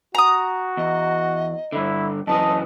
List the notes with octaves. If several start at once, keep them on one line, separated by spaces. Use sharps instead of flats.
F#4 A#5 D#6
E2 D#5
G2 D3 E4
F#2 E3 G#4 D#5 A5